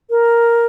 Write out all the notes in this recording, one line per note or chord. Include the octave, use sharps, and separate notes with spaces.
A#4